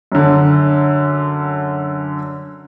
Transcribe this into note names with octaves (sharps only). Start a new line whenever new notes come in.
F#2 D3